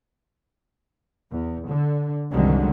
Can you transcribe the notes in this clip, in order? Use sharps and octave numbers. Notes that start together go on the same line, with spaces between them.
E2
D3
C2 F#2 D3 D#3 G#3